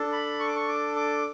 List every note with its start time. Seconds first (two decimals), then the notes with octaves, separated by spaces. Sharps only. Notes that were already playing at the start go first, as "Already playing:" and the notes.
Already playing: D4 A4
0.12 B5
0.39 C#6
0.47 D6
0.56 C#6
0.68 D6
0.96 D6